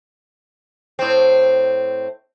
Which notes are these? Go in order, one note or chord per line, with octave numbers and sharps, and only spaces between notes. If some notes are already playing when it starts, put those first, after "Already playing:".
A2 C4